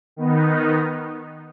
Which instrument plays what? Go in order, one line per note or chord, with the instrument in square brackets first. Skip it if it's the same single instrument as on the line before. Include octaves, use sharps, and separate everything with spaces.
[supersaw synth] D#3 B3 D#4